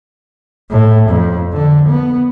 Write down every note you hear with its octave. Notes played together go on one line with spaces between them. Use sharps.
A2
F2
D3
B3